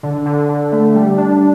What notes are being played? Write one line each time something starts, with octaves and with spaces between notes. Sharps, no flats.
D3
D3
D3
A3
G3
D4